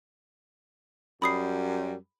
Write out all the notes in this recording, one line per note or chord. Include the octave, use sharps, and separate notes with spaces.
F#2 G3 B5 D#6 C7